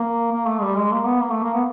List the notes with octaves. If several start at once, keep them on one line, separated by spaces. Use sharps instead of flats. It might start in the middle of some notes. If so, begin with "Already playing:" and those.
Already playing: A#3
A#3
A3
G3
G#3
A#3
B3
A#3
A3
A#3
B3